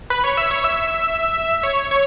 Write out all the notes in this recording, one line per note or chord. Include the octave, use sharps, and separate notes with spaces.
B4
C#5
E5
C#5
E5
C#5
C#5